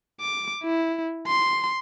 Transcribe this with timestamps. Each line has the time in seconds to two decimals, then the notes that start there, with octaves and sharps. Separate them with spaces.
0.21 D6
0.63 E4
1.27 C6